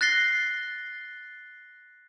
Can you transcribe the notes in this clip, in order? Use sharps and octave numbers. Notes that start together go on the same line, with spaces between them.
F#6 A6 A#6 C7 G7